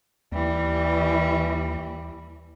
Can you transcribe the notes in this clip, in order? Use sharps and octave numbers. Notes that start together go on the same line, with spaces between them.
D#2 E3 G3